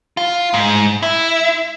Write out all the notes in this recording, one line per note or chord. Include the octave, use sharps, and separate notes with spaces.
F4
G#2
E4